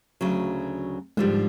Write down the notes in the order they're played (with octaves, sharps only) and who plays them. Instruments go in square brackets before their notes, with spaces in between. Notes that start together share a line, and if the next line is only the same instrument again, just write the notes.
[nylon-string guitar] D2 C#3 F#3
[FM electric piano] G#2 [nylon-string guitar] D3 F3 G3